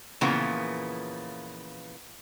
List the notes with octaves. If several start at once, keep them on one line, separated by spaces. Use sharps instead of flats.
A#2 C#3 E3 F3 A#3 B3